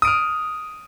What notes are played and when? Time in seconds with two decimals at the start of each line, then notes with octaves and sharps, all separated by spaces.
0.02 D#6
0.05 D7
0.07 F6